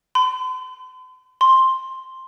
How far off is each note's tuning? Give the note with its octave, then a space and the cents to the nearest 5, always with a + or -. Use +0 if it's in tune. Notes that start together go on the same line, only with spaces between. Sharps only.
C6 -45
C6 +5